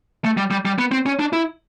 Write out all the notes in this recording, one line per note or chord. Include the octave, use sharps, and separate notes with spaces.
A3
G3
G3
G3
B3
C4
C#4
D4
E4